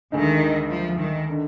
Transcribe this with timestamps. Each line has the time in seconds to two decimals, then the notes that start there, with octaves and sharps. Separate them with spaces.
0.12 D2 D3 D#3 G#3 D#4
0.69 F3
0.99 D#3
1.30 D3